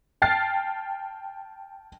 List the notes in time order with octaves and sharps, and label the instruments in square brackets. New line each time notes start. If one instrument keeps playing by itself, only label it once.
[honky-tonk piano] G5 A5 F6 A6 C7